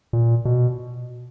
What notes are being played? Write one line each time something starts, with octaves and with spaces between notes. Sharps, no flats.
A#2
B2